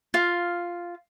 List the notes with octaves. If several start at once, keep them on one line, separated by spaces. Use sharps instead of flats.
F4 F5